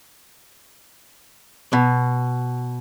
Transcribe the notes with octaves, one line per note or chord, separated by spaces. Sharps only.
B2